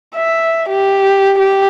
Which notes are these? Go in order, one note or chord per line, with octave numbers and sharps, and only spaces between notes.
E5
G4
G4